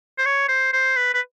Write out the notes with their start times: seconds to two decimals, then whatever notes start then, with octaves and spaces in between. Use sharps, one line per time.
0.18 C5
0.26 C#5
0.48 C5
0.73 C5
0.96 B4
1.14 B4